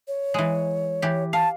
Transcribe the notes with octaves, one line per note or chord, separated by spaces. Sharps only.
C#5
E3 G#3
E3 G4
F5 A5